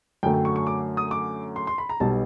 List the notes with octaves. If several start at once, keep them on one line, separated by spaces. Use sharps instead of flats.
F#2 D3 F#3 A3 G5
G5
C#6
C#6
D6
D#6
D6
C6
C6
B5
A#5
B1 B2 G3 A5